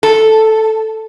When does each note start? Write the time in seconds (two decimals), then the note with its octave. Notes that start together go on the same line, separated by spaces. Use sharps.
0.03 A4